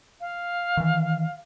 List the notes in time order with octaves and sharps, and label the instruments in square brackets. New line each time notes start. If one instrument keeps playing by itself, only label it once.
[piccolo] F5
[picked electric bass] D#3 E3